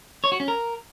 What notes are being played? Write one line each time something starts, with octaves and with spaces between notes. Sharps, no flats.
C#5
F#4
C#4
A#4